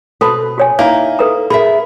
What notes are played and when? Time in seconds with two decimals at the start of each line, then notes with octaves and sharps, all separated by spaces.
0.21 B2 C4 A4 B4 A5 B5
0.58 F#4 C#5 G#5
0.79 A#3 D#4 E4
1.19 A4 B4 A#5
1.50 G#4 A#4 E5 B5